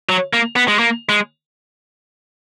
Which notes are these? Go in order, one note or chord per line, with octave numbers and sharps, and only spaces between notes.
F#3
A#3
B3
G#3
A#3
G#3